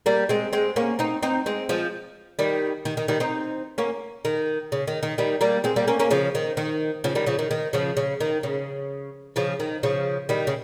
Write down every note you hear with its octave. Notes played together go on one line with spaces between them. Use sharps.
G3 A#3
G#3 C4
G#3 C4
A#3 C#4
C4 D#4
C4 D#4
G#3 C4
F3 G#3
D#3 G3
D#3
D#3
D#3 G3
C4 D#4
A#3 C#4
D#3
C#3
D#3
D#3
D#3 G3
G3 A#3
G#3 C4
G3 A#3
A#3 C#4
A#3 C#4
C#3 F3
D#3
D#3
C#3 F3
D#3 G3
C#3 F3
D#3
D#3
C#3 F3
C#3
D#3
C#3
C#3 F3
D#3
C#3 F3
D#3 G3
C#3